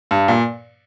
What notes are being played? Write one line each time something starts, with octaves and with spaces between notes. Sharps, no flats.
G2
A#2